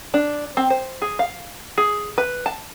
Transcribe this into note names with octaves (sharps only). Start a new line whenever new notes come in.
D4
C4
C5
G#4
F5
G#4
B4
A5